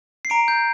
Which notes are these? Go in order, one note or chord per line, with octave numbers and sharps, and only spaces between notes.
C7
A#5 D7
G6